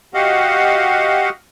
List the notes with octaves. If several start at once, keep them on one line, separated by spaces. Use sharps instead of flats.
F#4 G4 D#5 F5 F#5